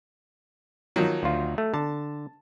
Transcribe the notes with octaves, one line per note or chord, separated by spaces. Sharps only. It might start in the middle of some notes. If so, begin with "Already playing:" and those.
D#3 F3 F#3
D2 F4
A3
D3 A5